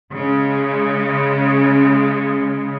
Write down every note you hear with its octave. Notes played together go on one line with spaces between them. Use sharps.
C#3 G#3